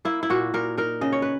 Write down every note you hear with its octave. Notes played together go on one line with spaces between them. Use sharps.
A#3 E4
E4
A#2 F#4
A#2 A#4
D#4 A#4
C#3 D#5
C#5
B4